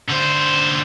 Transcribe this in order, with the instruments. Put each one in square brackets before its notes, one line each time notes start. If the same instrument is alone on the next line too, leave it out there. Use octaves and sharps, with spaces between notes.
[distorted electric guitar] D3 C5